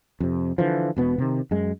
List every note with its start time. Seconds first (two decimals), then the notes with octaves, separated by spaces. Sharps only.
0.20 F2 C3
0.58 D3 E3 F3
0.97 E1 B2 B3
1.18 C3 D#3
1.51 F#2 G#3